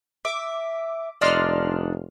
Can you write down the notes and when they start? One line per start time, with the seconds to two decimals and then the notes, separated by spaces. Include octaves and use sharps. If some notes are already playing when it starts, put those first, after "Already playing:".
0.25 E5 D6
1.21 F1 D4 D#4 D5 C6 F6